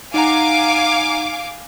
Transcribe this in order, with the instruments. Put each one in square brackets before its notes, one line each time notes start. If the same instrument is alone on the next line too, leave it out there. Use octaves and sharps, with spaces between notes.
[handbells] D#4 F#5 A#5 [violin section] F5 G#5 D6